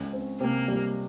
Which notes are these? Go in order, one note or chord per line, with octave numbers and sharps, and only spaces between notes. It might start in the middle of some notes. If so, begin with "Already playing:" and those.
Already playing: C#2 C#4
C4
C3 A#3
G3